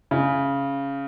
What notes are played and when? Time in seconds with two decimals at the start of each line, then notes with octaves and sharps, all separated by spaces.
0.11 C#3